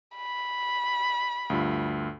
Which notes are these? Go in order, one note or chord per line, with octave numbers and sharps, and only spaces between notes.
B5
D2 G2 F4